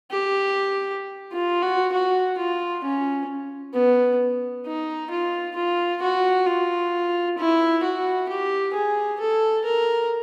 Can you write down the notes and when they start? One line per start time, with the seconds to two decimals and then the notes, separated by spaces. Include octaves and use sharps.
0.11 G4
1.32 F4
1.62 F#4
1.92 F#4
2.37 F4
2.84 C#4
3.74 B3
4.66 D#4
5.10 F4
5.55 F4
6.02 F#4
6.46 F4
7.38 E4
7.83 F#4
8.29 G4
8.74 G#4
9.20 A4
9.65 A#4